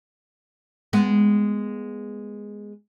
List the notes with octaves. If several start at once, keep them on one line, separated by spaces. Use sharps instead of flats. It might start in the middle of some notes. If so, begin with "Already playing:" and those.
G#3 B3